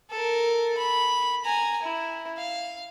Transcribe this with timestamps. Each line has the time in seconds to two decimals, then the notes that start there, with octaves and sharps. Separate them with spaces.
0.10 A4 A#4
0.77 B5
1.45 G#5 A#5
1.83 E4
2.38 F5